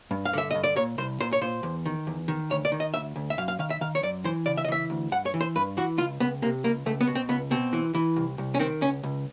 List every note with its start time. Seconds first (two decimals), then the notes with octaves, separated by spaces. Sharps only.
0.11 G2
0.25 F5
0.33 D3 E5
0.51 G2 D#5
0.64 D5
0.76 A#2 C#5
0.98 C2 C5
1.20 A#2 C5
1.33 C#5
1.41 A#2 C5
1.63 E2
1.86 D#3
2.07 E2
2.28 D#3
2.50 D2 C#5
2.65 D5
2.72 D#3
2.80 D#5
2.94 D2 E5
3.16 D2
3.30 E5
3.38 F#2 F5
3.48 F5
3.59 D#3 F5
3.70 E5
3.81 D#3 F5
3.95 C#5
4.03 F#2 D5
4.25 E3 C5
4.46 C#3 D5
4.57 E5
4.65 D#5
4.68 E3 E5
4.90 D2
5.12 G2 F#5
5.26 C#5
5.34 E3
5.41 C5
5.55 G2 B4
5.77 E3 F#4
5.98 C#2 F4
6.20 C#2 B3
6.42 C3 A#3
6.64 C#2 A#3
6.86 C#2 A3
7.01 B3
7.07 B2
7.15 C4
7.29 C#2 B3
7.51 B2 C4
7.73 E3
7.95 E3
8.16 C2
8.38 C2
8.55 C#4
8.60 D#3 C4
8.81 C#2 C#4
9.03 C#2